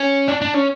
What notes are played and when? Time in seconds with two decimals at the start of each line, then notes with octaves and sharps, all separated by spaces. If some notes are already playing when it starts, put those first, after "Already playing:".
Already playing: C#4
0.28 D4
0.41 D4
0.54 C#4